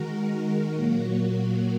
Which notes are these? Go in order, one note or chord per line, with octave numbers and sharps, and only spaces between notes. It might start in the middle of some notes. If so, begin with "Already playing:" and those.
Already playing: D#3 G#3 F#4 A#4
A#2 F#3 A#3 F#4